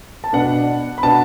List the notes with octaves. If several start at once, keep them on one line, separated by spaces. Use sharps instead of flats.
A5
B2 B3 D4 F#5
B5
B2 B3 D4 A5